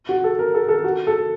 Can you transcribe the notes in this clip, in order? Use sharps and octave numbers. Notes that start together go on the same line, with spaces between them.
F#4
A4
A#4
A4
A4
F#4
A4